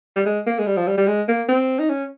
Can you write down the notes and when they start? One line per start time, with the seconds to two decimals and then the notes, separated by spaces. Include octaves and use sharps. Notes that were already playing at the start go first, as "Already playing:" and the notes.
0.16 G3
0.26 G#3
0.47 A#3
0.59 G#3
0.67 G3
0.77 F3
0.88 G3
0.98 G3
1.08 G#3
1.29 A#3
1.49 C4
1.79 D#4
1.90 C#4